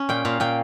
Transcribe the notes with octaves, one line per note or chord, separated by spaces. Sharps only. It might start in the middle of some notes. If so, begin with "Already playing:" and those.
Already playing: C#4
A#2 G5
A#2 F5
A#2 G5